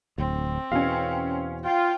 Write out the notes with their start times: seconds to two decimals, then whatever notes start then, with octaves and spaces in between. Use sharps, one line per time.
0.18 D1 D2 C4
0.72 E2 B2 C#4 F5
1.64 F4 G5